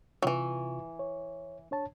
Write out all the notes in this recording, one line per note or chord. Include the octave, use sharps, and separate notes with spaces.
C3 E3 F#3 F4 C#6
C#5
D4 C#5 A5